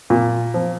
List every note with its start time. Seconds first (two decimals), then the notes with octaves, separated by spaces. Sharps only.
0.10 A#2
0.54 F3